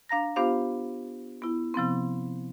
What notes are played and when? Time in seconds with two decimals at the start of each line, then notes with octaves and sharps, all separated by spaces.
0.09 D4 F5 A#5 A#6
0.36 B3 D4 F4 G4 C5 F5
1.42 B3 E4
1.74 C3 F3 B3 C4